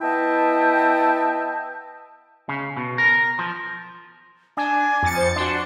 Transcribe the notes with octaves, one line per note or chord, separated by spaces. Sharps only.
B3 E4 D#5 E5 G5 A5
C#3
B2
A#4
F3
D4 G#5
F2 A6 C#7
C5
D4 F#4 C6